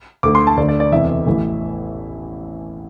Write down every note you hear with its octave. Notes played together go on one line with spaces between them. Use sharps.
D2 D3 D6
C6
A5
D2 D3 D5
D5
D5
E1 E2 C3 E3 E5
A1 A2 E3